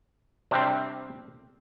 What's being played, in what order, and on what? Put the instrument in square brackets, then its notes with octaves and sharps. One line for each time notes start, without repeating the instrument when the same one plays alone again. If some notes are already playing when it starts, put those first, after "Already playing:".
[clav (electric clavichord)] C3 G3 C4 D4